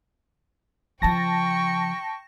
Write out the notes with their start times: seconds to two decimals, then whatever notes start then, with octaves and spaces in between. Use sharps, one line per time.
1.02 C#3 F3 G5 A5 C#6 A#6